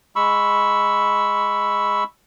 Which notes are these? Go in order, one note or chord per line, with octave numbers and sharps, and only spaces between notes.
G#3 B5 C#6 E6